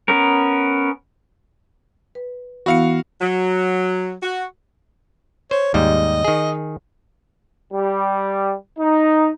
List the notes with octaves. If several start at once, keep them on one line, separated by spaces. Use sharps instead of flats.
B3 C#4 A#4
B4
E3 B3 E4 F#4 F5 C#7
F#3
F#4
C5 C#5
D#2 G#2 G3 D#5
D#3 G#4
G3
D#4